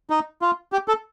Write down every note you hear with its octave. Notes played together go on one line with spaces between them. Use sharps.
D#4
F4
G4
A4